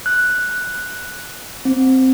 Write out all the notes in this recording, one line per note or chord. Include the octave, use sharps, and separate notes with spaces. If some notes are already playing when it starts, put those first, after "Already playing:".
F#6
C4